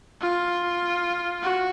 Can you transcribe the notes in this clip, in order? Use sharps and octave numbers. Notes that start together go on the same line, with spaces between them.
F4
F#4